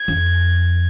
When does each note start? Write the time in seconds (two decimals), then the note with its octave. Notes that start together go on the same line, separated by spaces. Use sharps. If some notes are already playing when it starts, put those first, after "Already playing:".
Already playing: G#6
0.08 F2